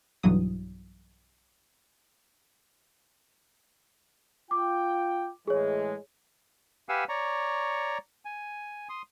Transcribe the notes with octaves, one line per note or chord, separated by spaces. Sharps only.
B1 G2 E3 F#3 D#6
F4 G5 D6
A2 E3 G#3 G#4 C#5
G4 B4 F5 F#5 G#5 E6
C#5 D5 A#5 C#6
G#5
C6 D#6